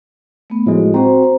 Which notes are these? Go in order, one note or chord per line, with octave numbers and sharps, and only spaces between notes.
A3 B3
A2 F3 G#3 A#3 F#4
C4 F#4 C5 A#5